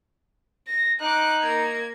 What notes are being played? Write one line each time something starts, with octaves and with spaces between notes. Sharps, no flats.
A#6
D#4 D6 F#6
A#3 G#6